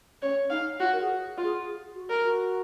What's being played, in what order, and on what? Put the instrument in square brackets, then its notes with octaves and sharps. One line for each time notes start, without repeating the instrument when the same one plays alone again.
[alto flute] C#4 [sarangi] C#5
[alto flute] D#4 [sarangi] F5
[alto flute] F4 [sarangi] F#4
[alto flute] A#4
G#4
[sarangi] F4
[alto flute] G#4
G#4
F#4
[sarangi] A#4
[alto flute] F#4